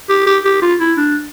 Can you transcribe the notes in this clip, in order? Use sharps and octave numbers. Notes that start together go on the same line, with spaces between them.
G4
G4
G4
F4
E4
D4